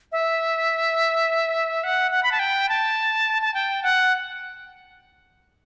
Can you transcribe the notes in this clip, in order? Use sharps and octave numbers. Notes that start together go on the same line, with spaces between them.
E5
F#5
F#5
B5
A5
G5
A5
A5
G5
F#5